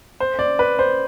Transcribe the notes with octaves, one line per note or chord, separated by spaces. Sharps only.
C5
D5
B4
C5